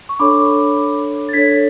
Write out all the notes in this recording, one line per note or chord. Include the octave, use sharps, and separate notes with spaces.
C#6
D4 A4 C#5 B5 D6
A6
D4 A4 C#5 G#6 B6